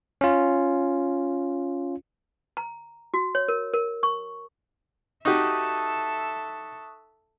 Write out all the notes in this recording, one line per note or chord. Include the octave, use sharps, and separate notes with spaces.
C#4 F4
A#5
F#4
C#5
A#4
A#4
C#6
D#4 F#4 G4 A4 E5 C#6 D#6 F#6